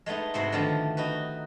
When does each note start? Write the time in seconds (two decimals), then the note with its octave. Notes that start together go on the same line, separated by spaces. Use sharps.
0.06 G#3 A3 B3 D#4
0.34 G#2 C3 E4 F#4 F#5 C6
0.52 D3 D#3 F3 A3 B3
0.97 D#4 F#4 B4